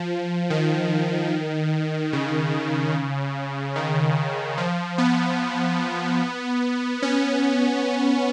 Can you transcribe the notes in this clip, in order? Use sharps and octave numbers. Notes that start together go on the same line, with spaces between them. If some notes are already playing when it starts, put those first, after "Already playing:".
Already playing: F3
D#3
C#3
D#3
F3
B3
C#4